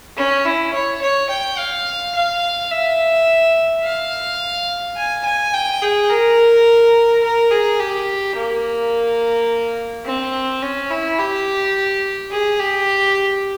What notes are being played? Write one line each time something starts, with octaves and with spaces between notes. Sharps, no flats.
C#4
E4
C#5
C#5
G5
F5
F5
E5
F5
G#5
G#5
G5
G#4
A#4
A#4
G#4
G4
A#3
C4
C#4
E4
G4
G#4
G4